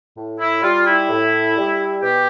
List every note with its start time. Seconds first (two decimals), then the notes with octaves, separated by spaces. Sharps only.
0.16 A2
0.39 E4
0.63 G3 F4
0.87 E4
1.09 A2
1.57 G3
2.03 B2 G4